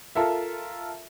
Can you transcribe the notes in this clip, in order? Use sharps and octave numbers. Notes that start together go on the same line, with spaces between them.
F4 A4 A#4 E5